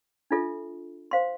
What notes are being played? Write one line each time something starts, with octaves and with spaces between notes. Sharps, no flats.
D4 F4 A4 E5
C5 F5 C6